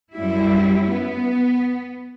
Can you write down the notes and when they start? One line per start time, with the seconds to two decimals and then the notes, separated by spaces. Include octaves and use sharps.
0.14 F#2 G3 E4
0.90 B3